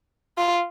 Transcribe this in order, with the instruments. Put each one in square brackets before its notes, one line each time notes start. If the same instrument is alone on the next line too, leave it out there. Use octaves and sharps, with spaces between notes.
[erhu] F4